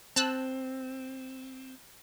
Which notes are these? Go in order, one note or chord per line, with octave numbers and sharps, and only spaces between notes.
C4 A5 E6 F#6